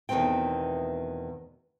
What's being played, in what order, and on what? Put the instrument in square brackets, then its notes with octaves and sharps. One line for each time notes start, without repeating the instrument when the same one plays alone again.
[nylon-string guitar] E2 B2 D#3 A3 C4 G5